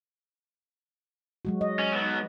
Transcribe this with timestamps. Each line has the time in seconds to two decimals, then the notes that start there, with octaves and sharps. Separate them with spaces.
1.45 F#3 G#3 F#4
1.61 D#5
1.79 C#4
1.93 F#3 B3